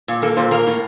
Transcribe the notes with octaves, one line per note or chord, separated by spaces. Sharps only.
A#2
A#3 A4
A#2 C5
A#3 A#4
A2